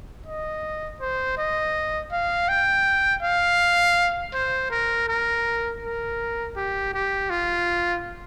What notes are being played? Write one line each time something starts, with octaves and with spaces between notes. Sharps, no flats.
D#5
C5
D#5
F5
G5
F5
C5
A#4
A#4
A#4
G4
G4
F4